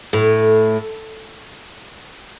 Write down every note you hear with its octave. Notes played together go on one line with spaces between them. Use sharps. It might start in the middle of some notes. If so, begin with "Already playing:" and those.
A2